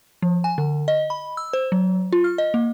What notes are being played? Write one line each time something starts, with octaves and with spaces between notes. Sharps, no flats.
F3
G#5
D3
D#5
B5
E6
C5
F#3
F4
F6
D#5
A#3